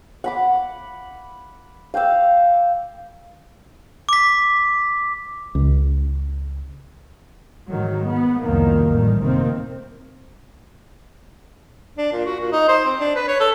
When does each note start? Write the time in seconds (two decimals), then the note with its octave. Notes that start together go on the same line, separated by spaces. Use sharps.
0.24 F#5 B5 D6
1.94 F5 G5 D6 E6
4.09 D6 B6
5.55 C#2
7.71 G#2 D#3 F#3
8.08 B3
8.43 C2 F2 D#3 F#3 A#3
8.90 A1 A2 D#3 G3
9.21 F1 F#2 C3 D#3 A#3 C4
11.98 D4
12.13 A#2
12.26 F#4
12.41 A#2
12.52 D#4
12.68 C5
12.85 C4
13.00 D4
13.16 B4
13.28 C#5
13.40 A4